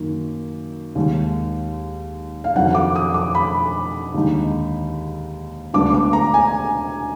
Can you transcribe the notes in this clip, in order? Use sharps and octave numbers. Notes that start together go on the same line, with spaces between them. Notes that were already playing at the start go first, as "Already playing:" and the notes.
Already playing: F#2 D#3 A#3
D#2 D#3 G#3
F5
F2 D#3 F#3 D4 F#5
D6
D#6
D6
B5
D#2 D3 G#3 D#4
D2 D3 G#3 B3 D4 D6
D6
A#5
G#5